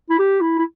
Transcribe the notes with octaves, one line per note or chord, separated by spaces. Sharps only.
E4
G4
E4
E4